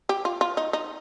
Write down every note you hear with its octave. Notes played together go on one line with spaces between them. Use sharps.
G4
F4
F4
D#4
D#4